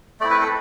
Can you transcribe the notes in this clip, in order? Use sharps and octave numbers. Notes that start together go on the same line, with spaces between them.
A3 C4 E4 D5
B4
A4